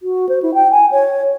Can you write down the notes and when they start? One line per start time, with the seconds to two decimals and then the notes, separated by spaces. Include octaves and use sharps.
0.02 F#4
0.29 C5
0.42 E4
0.54 G5
0.71 G#5
0.92 C#5